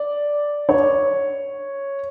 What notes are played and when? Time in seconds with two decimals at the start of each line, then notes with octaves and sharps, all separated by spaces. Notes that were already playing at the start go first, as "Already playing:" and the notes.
Already playing: D5
0.69 C#5